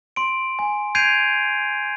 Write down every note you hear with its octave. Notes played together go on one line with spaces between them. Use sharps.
C6 D7
G#5
G6 G#6 C7 D7 D#7 F7